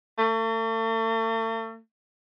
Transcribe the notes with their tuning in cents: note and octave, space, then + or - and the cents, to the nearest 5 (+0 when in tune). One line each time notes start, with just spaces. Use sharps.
A3 +40